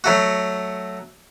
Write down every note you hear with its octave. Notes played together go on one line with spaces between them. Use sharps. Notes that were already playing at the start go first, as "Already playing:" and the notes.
F#3 A3 F#4